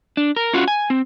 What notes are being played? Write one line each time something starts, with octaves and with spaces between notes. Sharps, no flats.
D4
A#4
C#4 F4 F#4
G#5
C4